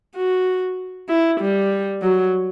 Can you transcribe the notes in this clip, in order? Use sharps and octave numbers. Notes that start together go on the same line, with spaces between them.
F#4
E4
G3
F#3